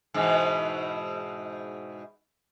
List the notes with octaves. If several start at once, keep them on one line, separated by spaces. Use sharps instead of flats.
G#2 B2 E3